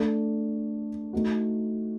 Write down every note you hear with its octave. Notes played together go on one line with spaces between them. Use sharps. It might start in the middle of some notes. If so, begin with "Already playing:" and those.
Already playing: A3 D4 A4
A3 D#4 F#4